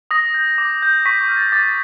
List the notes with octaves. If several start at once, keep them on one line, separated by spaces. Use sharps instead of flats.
D#6 A#6
G6
D6
G6
C#6 B6
F6
A6
D6 A6